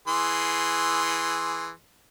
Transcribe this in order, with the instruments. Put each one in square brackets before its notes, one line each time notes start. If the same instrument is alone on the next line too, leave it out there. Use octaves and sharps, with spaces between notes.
[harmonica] E3 G#4 C6